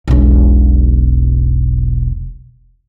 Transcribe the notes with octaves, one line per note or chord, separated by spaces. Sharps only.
E1 B1